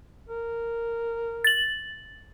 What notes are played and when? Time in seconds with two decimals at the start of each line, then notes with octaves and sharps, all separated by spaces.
0.29 A#4
1.44 A6 F#7